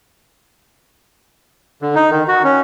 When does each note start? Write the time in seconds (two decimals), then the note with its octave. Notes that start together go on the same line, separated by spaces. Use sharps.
1.82 D3
1.95 D#4
2.11 D#3
2.28 F#4
2.44 C#4